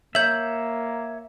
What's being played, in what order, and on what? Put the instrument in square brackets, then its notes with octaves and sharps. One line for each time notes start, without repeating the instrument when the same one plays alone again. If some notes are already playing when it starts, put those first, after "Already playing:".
[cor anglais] A#3 [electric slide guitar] C#5 E5 [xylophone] G6 F#7